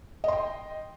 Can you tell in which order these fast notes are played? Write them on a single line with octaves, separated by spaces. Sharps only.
D#5 C6 G5